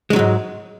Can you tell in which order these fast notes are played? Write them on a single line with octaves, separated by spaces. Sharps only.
G#3 D#3 F#3 G#2